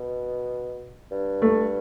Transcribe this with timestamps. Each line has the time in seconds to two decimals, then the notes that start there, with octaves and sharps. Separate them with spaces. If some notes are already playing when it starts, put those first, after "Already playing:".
Already playing: B2
1.12 G2
1.42 A3